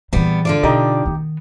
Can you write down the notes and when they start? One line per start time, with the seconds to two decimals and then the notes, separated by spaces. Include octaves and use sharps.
0.13 A#2 E3 G3 B3
0.45 D3 F4 D5
0.63 B2 D#4 G4 D#5
1.06 D#3 B3